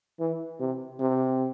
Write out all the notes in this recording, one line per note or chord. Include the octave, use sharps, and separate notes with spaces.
E3
C3
C3